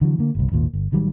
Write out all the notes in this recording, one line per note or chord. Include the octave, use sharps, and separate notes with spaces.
D3 E3 F#3
D3 A#3
G1 C2
G#1 D#2 A#2
G1
A1 D#3 F#3 G3